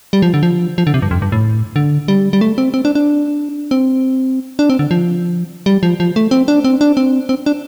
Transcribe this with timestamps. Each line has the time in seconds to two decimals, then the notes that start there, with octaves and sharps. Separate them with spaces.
0.13 G3
0.22 F3
0.34 D3
0.43 F3
0.78 F3
0.87 D3
0.94 C3
1.02 G2
1.11 F2
1.22 G2
1.32 A2
1.76 D3
2.08 G3
2.33 G3
2.41 A3
2.58 C4
2.74 C4
2.85 D4
2.95 D4
3.71 C4
4.59 D4
4.70 C4
4.79 D3
4.91 F3
5.66 G3
5.83 F3
6.00 F3
6.16 A3
6.31 C4
6.48 D4
6.64 C4
6.81 D4
6.97 C4
7.29 C4
7.46 D4